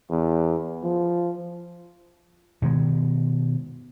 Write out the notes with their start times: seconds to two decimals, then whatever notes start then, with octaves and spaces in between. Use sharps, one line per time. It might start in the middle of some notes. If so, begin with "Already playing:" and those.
0.10 E2
0.84 F3
2.62 B2 D#3 G#3